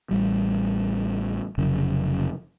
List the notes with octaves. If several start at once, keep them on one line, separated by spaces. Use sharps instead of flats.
A1 G3
F1 C#3 F#3